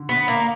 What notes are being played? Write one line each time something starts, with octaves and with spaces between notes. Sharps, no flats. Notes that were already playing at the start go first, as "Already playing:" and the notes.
Already playing: D3
B3
A#3